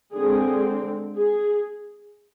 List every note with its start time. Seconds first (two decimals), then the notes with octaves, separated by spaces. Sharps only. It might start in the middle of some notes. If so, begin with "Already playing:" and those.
0.13 D3 G#3 C4 G#4
1.15 G#4